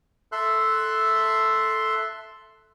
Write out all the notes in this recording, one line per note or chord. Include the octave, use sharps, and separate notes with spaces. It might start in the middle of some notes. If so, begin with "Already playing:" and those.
A4 E5 C6 F#6